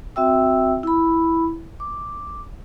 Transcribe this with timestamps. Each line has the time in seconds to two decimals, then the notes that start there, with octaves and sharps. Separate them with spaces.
0.16 C4 F#4 E5 G5 E6
0.83 E4 B5
1.80 D6